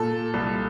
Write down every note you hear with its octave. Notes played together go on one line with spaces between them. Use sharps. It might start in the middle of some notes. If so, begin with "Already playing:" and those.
Already playing: A#2 A4
C2